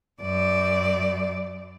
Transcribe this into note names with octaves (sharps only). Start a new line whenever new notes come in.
F#2 D5